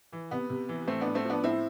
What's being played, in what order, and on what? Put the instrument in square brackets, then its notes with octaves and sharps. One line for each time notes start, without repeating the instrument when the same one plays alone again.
[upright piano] E3
C3 B3
C3
E3
A2 A3 C4
B3 D4
A2
A3 C4
F3 B3 D4
A2 C4 E4